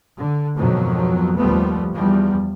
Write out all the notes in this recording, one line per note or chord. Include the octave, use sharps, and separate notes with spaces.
D3
F2 G#2 B2 D#3 F3 F#3
D#2 F3 G3 A3 B3
E2 F3 G3